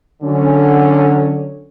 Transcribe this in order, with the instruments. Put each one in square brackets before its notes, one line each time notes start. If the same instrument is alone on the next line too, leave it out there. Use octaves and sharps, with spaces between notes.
[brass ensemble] D3 F#3 C#4